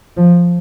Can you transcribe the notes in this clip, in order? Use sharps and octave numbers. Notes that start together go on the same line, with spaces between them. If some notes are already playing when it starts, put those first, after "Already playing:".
F3